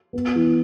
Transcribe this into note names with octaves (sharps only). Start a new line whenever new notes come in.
B3
E3